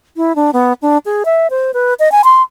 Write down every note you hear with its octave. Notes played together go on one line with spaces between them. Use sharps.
E4
D4
B3
D4
G#4
E5
C5
B4
D#5
G#5
C6